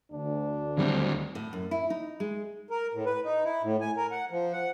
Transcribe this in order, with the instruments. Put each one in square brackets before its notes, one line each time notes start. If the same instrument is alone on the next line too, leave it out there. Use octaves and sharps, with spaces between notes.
[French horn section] D2 [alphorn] D4
[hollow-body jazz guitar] D#2 G3 C4 [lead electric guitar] D3 F#3
[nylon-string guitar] A2
F#2
E4
D#4
G#3
[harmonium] A#4
A2
B4
D#4
E4
A2
G#5
A#4
F#5
F3
F#5